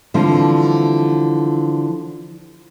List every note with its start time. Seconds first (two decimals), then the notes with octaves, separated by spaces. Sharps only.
0.14 D3 E3 F3 G3 C4 E4